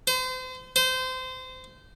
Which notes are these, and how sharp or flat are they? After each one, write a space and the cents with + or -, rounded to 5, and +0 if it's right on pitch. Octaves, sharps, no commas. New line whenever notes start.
C5 -35
C5 -25